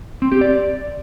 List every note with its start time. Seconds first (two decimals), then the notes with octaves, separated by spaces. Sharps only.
0.22 C4
0.32 G4
0.41 D5